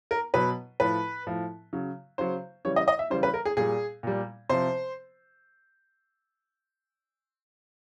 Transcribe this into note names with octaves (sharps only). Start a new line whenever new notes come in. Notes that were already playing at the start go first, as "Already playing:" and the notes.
A#4
B2 F#3 B4
A2 F3 B4
A2 F3
C#3 F#3
C#3 F#3 C5
C#3 E3 G3 C#5
D#5
D#5
E5
C#3 E3 G3 C5
B4
A#4
G#4
A#2 G3 G#4
A#2 G3
C3 F3 C5